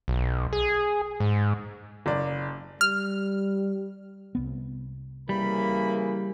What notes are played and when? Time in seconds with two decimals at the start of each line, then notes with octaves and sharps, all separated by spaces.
0.08 B1
0.53 G#4
1.20 G#2
2.06 F#1 D5
2.81 G3 F6
4.35 C2 B3
5.29 C#3 E3 G3 A#3 B5